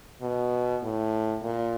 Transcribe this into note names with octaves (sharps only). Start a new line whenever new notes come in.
B2
A2
A#2